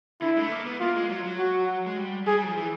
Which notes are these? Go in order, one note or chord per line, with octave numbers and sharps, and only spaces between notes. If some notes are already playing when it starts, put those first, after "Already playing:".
D3 E4
G#3
A3
A#3
B3
A#3 F4
G#3
F#3
F#3
F#4
G#3
G3
G3 G#4
G3
F#3
F3
E3